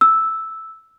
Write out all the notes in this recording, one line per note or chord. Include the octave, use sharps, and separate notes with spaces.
E6